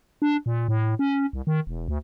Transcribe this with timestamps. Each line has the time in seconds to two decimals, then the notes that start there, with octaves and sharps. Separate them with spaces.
0.22 D4
0.46 A#2
0.68 A2
0.99 C#4
1.33 C2
1.47 D#3
1.67 E1
1.88 D2